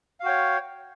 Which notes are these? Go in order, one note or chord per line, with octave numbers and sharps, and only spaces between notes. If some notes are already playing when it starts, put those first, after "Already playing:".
F#4 C#5 F5 G5